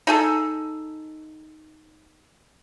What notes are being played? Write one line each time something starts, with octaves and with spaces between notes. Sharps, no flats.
D#4 G#4 A4